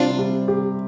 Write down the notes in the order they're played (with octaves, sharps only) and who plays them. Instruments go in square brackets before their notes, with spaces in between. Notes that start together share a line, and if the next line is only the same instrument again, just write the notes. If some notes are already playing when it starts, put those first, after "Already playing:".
Already playing: [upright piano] C3 G3 C4 [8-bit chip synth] D4 F4
[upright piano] G3
G4